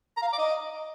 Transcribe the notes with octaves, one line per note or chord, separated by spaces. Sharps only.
A#5
F5
A#5
D6
D#5